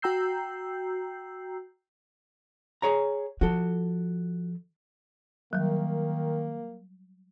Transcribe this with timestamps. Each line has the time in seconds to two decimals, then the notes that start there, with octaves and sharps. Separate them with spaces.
0.02 F#4 G5 A#5 E6 G6 C7
2.82 G#4 C#5 A#5
3.41 F3 F#4 A4
5.53 D#3 F#3 G3 A#3